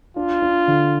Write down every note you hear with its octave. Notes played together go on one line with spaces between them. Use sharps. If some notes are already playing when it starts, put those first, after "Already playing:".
D4 F4
D4
D3